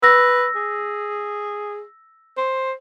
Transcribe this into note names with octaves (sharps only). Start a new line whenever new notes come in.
B4 E6 A#6
G#4
C5